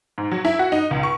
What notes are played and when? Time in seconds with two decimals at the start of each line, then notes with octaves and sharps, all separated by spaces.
0.18 G#2
0.31 F#3
0.45 E4
0.59 F#4
0.72 D#4
0.91 C#2
1.03 C#6